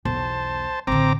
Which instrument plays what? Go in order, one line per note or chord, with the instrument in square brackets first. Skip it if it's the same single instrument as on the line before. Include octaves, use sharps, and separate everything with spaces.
[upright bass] B1 E2 [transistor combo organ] C5 A5
[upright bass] A1 D3 [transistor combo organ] C4 A#5 D6